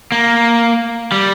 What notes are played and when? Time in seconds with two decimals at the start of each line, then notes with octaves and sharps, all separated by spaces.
0.12 A#3
1.12 G3